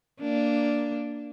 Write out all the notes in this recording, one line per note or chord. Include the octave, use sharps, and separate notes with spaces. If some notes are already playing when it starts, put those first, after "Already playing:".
A#3 D4